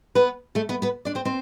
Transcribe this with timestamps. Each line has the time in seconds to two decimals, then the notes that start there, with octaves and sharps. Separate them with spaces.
0.15 B3 B4
0.55 A3 A4
0.69 B3 B4
0.82 B3 B4
1.05 D4 D5
1.15 C4 C5
1.25 C4 C5